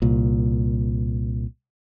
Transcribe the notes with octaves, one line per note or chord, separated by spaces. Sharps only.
C2 A#2